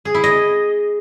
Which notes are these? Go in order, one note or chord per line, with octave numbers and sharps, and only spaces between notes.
G#4
E4
D#5